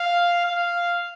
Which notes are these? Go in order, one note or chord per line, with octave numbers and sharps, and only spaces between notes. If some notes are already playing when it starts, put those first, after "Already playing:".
Already playing: F5
F5